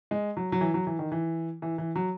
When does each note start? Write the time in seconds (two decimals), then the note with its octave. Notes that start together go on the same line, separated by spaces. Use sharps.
0.11 G#3
0.37 F#3
0.52 F#3
0.61 E3
0.74 F#3
0.87 E3
0.99 D#3
1.12 E3
1.62 E3
1.78 E3
1.95 F#3